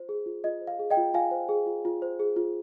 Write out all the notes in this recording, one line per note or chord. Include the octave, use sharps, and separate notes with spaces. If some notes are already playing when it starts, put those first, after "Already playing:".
Already playing: F4 C5
G#4
F4
F4 D#5
C5
F5
G#4
D#5 G5
F4
F4 F5 G#5
C5
G#4
F4
F4
C5
G#4
F4